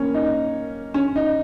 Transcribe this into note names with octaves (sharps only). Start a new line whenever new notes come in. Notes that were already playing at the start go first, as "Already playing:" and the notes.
Already playing: A#3 C#4
D#4
C#4
D#4